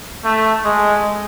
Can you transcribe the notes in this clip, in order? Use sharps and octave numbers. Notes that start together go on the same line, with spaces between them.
A3
G#3